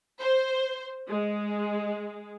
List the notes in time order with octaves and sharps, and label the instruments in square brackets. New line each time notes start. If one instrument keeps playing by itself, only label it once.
[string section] C5
G#3